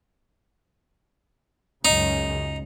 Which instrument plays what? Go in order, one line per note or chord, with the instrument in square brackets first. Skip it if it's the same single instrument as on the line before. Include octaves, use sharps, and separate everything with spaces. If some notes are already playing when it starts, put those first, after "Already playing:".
[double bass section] C#2 F#2 C#3 [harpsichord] D#4